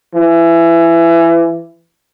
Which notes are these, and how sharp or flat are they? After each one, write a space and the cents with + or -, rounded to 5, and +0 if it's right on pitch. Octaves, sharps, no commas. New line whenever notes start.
E3 +25